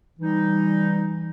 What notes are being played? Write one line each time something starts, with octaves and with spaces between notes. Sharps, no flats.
E3 G3 D#4